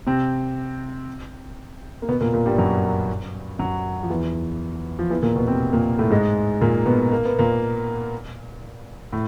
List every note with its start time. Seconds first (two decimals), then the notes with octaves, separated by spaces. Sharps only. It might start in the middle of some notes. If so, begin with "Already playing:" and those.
0.07 C3 C4
2.02 A#3
2.08 B2 B3
2.21 A#2 A#3
2.33 A#2 A#3
2.46 G2 G3
2.58 F#2 F#3
3.59 F#2 F#3
4.03 F3
4.09 E2 E3
4.99 F3
5.10 E2 E3
5.22 A#2 A#3
5.35 B2 B3
5.47 C3 C4
5.73 A#2 A#3
5.98 A2 A3
6.10 G#2 G#3
6.61 A#2 A#3
6.86 B2 B3
7.12 A#3
7.25 B3
7.39 A#2 A#3
9.13 A2